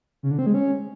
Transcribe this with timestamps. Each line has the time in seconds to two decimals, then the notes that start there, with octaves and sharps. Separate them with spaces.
0.23 C#3
0.31 D3
0.39 C4
0.46 G#3
0.54 C#4